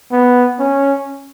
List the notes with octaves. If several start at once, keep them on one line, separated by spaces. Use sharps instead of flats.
B3
C#4